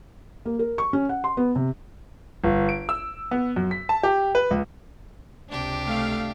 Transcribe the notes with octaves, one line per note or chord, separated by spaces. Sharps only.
A#3
A#4
C#6
C#4
F#5
C6
B3
C3
G1
D7
E6
B3
F#2
B6
A5
G4
B4
C#2
C#2 C3 D4 G4
A3 F5